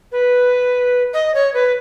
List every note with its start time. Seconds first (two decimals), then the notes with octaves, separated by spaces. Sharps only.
0.12 B4
1.13 D#5
1.34 C#5
1.54 B4